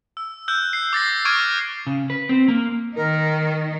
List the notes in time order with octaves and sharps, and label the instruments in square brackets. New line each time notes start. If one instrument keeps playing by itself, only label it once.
[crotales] E6
E6 F#6 G6
C7
D6 A6 A#6 C7
C#6 D6 F6 G#6 D7
[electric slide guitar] C#3
B4
C4
A#3
[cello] D#3 D#4 [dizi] A#4